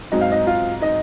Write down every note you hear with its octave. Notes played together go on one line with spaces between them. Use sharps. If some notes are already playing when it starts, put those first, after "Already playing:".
G#2 F#3 C4 D#4 D#5
F5
D#4 D#5
F4 F5
D#4 D#5